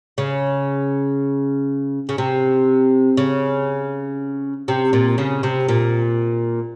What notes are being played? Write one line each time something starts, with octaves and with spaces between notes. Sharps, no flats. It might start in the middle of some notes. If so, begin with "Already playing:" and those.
C#3
C#3
C3
C#3
C3
A#2
C#3
C3
A#2